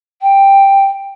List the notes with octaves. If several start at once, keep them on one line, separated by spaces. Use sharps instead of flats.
G5